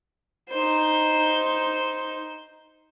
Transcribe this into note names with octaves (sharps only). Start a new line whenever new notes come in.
D#4 C5